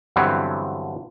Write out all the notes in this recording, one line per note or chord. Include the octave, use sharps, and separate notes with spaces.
G2 D3 E3 F#3 B3 C4